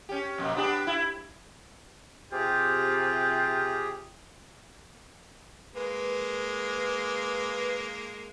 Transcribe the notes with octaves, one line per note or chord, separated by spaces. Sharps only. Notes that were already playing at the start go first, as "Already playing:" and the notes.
C#4 G4
F2 B2 A#3
B3 D4 G4
E4
C3 F4 G4 G#4 G5
G#3 A#3 B4